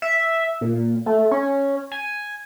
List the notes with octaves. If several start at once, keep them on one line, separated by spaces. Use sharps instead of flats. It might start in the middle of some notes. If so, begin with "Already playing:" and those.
E5
A#2
A3
C#4
G#5